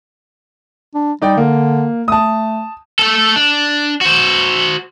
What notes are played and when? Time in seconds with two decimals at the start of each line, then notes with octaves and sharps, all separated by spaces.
0.94 D4
1.22 G3 D#4 D5 G5
1.37 D3 A#3
2.08 A3 A5 D#6
2.99 A3 A4
3.36 D4
4.01 F#4 C5